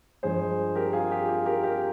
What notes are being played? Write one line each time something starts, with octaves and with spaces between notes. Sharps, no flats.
G2 F3 G#3 G#4 C5
G4 A#4
F4 G#4
G4
G4
G4 A#4
G4 A#4